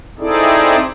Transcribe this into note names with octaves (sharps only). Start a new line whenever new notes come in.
C4 D#4 E4 G#4 A4 D5